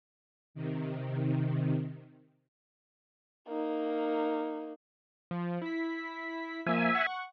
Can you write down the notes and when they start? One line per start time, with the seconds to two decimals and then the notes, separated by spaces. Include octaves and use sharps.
0.54 C3 D#3
3.48 A#3 D#4
5.31 F3
5.62 E4 B6
6.67 F3 A#3 E5 G#5
6.95 F#5 C#6